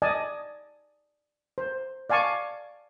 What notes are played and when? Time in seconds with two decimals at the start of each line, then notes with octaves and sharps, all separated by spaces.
0.02 D5 D#5 G#5 A5
1.58 C5
2.10 D5 F5 G#5 A5 C#6 D6